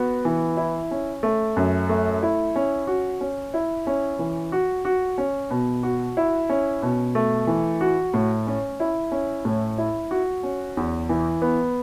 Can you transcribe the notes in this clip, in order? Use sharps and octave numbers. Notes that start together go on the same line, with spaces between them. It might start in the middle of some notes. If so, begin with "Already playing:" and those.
Already playing: B3 F#4
E3
E4
C#4
A3
F#2
A3
E4
C#4
F#4
C#4
E4
C#4
E3
F#4
F#4
C#4
B2
F#4
E4
C#4
B2
A3
E3
F#4
A2
C#4
E4
C#4
A2
E4
F#4
C#4
E2
E3
B3